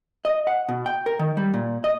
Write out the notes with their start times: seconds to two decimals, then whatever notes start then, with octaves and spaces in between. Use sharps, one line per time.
0.25 D#5
0.47 F#5
0.69 B2
0.86 G5
1.06 A#4
1.19 D#3
1.37 G3
1.54 A#2
1.84 D#5